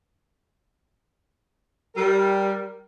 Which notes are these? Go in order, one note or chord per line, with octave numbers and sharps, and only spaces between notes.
G3 A#4